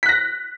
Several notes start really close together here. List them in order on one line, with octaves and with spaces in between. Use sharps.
B6 F#6 A#6